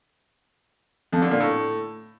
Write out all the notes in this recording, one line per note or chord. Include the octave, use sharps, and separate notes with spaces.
F2
D3
A#2
A2